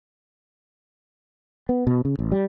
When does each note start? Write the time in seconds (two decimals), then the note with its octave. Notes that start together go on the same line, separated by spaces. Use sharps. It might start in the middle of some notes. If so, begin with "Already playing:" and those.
1.69 B3
1.87 B2
2.05 C#3
2.19 A1
2.32 G3